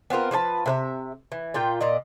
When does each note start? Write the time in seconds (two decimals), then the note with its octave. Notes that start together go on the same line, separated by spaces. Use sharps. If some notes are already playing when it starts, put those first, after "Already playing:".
0.10 B3 C4 F4 A#4
0.31 F3 B4 C#5 A5
0.66 C3 B4 E5
1.32 E3
1.54 A#2 F4 G5
1.81 A#2 D5 D#5